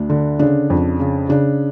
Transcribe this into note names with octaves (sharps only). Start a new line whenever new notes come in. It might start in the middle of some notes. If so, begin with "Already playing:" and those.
Already playing: D2 D4
D3
C#3 D4
F2
C#3
C#3 D4